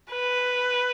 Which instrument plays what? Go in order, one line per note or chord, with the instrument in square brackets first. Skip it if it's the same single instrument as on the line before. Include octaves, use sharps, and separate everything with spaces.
[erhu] B4